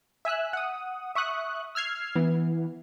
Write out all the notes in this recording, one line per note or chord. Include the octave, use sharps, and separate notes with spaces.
E5 G#5 E6 F#6
F#5 D#6
E5 C#6 D#6 F#6
E6 F6 G#6 C7
E3 B3